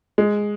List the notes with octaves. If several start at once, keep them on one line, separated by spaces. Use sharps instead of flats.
G#3